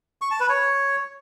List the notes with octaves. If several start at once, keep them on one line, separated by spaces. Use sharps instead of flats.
C#6
A5
B4
C#5